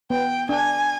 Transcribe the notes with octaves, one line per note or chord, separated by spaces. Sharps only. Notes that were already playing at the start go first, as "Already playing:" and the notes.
B3 G5
D4 G#5